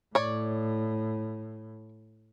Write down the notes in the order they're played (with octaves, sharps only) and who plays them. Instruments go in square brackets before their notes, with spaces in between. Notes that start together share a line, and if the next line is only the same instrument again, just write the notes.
[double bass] A2 [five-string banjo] C#5 D5